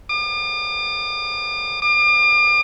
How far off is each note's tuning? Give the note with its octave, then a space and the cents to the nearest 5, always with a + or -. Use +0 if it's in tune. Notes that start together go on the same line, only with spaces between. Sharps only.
D6 +45
D6 +40